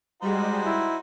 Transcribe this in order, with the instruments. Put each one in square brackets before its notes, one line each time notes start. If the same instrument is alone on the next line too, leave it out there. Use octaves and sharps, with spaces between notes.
[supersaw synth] G3 G#3 [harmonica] D#4 F#4 C5
[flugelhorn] E4